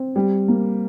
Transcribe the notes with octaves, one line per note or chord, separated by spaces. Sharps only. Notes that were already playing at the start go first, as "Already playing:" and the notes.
Already playing: C4
G3
A#3